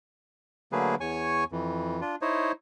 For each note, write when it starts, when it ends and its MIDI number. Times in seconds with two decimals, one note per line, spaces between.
0.72 0.95 50
0.72 0.95 54
0.72 0.95 57
0.72 0.95 58
0.72 0.95 68
0.72 0.95 71
1.00 1.44 40
1.00 1.44 73
1.00 1.44 80
1.00 1.44 85
1.52 2.01 41
1.52 2.01 52
2.01 2.16 62
2.01 2.16 65
2.22 2.52 63
2.22 2.52 64
2.22 2.52 72
2.22 2.52 73